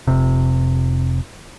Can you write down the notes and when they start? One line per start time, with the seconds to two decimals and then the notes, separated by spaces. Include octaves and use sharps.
0.07 F1 C3